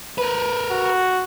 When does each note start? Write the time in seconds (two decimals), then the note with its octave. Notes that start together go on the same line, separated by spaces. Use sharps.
0.18 A#4 B4
0.71 F#4